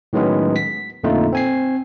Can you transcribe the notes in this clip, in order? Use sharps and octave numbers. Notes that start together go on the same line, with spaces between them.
A2 D#3 F#3 G#3 B3 C#4
B6
F2 A#2 D3 A3 D#4 F4
C4 G#5 C7